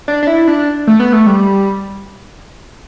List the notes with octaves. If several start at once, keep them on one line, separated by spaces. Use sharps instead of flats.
D4
D4
E4
D4
A3
B3
A3
G3